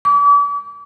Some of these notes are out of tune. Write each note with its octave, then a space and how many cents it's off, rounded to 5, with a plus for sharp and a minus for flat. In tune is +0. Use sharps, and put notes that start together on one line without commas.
D6 -40